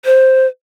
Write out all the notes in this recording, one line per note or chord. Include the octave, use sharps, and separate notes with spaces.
C5